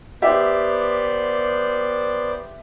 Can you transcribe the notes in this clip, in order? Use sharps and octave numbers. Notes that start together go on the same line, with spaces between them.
B3 G4 C5 D5 E5